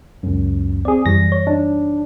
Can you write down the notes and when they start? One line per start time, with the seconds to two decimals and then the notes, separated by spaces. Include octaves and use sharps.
0.23 C#2 F#2
0.85 C4 G#4 D5
1.06 F#2 E3 G3 A#6
1.32 C#5
1.47 D4 D#4